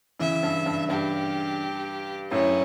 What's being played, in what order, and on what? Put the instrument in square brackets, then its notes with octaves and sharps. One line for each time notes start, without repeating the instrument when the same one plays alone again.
[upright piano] C#3 E3 [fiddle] E5
[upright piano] G2
G2
[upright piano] G2 [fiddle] G4
[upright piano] F#2 A2 [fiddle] C#4